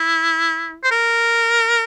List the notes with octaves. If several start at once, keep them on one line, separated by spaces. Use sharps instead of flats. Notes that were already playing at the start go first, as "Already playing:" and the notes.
Already playing: E4
C5
A#4